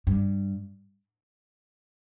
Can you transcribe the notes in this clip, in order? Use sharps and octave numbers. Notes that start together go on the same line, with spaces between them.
G2